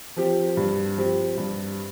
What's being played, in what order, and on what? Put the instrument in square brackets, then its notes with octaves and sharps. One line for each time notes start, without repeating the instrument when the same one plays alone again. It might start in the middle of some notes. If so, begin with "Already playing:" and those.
[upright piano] F3 C4 G4
G2
F3 C4 G4
G2